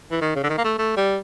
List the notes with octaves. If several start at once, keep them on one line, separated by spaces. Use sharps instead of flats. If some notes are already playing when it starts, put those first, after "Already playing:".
E3
D#3
C#3
D3
D#3
A#3
A3
A3
G3